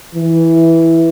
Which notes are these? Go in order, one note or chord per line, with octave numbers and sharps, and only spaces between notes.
E3